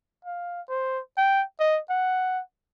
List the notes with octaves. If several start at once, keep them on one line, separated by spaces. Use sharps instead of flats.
F5
C5
G5
D#5
F#5